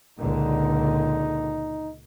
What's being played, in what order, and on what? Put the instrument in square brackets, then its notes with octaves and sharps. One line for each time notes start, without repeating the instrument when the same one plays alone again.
[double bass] C#2 A#2 [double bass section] D3 [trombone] D#4